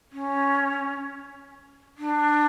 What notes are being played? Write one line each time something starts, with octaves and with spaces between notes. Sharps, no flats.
C#4
D4